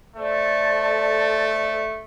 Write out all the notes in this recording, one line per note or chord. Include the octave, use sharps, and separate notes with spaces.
A3 A4 C5 D5